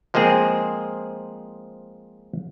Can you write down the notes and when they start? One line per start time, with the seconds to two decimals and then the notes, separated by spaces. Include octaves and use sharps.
0.14 F3 G#3 A#3 C4 G#4